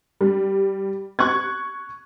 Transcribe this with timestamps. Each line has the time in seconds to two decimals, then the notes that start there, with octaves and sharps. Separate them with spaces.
0.21 G3
1.19 C#6 F#6 G#6